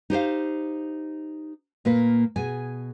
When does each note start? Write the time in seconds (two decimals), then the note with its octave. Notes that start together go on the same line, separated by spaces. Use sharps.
0.10 D#4 G4 C5 F5
1.85 A#2 A#3 B4
2.36 B2 G#4 G#5